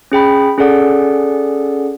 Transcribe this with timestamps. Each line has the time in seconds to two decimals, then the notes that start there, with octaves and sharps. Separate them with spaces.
0.12 C#4 G#4 G5 B5
0.58 C#4 G#4 A4 D5 F#5